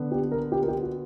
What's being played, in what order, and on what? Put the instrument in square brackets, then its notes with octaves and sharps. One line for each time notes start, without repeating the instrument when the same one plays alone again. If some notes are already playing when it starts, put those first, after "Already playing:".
Already playing: [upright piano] D3 B3
[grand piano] G4
A#4
G4
A#4
G4
F#4